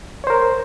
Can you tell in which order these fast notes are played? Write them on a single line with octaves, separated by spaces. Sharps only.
C#5 C5 A#4